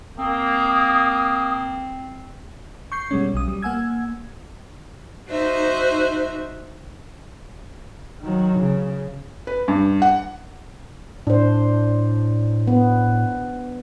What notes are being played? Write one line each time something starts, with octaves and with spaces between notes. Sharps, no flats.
A#3 C4 D#6
C#6 G6 C7
B2 G3 G#3 C#4
B1 D#6
G3
A#3 F#5 G#5 E6 G#6
D#4 F#4 C5 E5
D#3 F#3
C#3
B4
G2
F#5
A2 D4 C5
B3